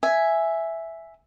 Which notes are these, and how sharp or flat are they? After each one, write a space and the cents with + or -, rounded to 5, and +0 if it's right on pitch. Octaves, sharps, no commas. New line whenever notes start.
E5 +0 G#5 +0